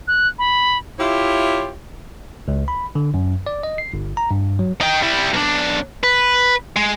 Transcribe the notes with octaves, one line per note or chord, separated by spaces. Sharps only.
F#6
B5
E4 F4 G4 C#5 E5
C#2
B5
D3
F#2
D5
D#5
C7
G1
A#5
G2
F#3
D#4 G5
G3 E4
B1 D4
B4
G#3